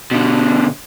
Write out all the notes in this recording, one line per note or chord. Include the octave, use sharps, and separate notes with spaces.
B2 D3